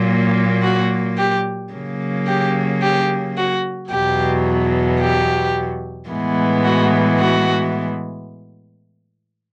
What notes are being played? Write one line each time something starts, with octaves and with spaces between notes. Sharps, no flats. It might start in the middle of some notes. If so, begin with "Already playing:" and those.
Already playing: A#2 F#3 A#3
F#4
G4
C#3 F#3 A#3
G4
G4
F#4
E2 B2 F#3 G4
G4
A2 E3 G#3 B3
F#4
F#4